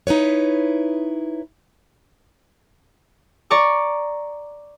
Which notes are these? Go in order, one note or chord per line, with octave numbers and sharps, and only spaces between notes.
D#4 E4 B4 C#5
D5 A#5 C#6 D6